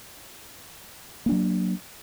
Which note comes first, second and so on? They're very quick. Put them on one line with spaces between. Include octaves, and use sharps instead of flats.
A#3 D4 F#3